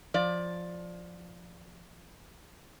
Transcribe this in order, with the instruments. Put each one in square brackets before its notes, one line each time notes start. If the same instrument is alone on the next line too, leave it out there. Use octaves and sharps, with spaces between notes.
[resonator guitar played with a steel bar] F3 D5